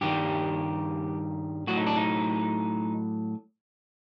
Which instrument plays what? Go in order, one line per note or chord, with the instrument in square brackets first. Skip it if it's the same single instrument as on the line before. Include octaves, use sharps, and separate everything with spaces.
[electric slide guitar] G2 D#3 G3 G4
A2 F#3 F#4
D#4
D4
D#4